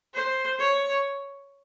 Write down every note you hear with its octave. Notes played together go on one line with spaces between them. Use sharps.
C5
C#5